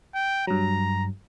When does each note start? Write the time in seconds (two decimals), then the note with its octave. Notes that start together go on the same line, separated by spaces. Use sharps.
0.15 G5
0.47 G2 F#3 A#5